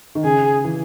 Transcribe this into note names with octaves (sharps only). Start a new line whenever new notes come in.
D#3
C#3 G#4
E3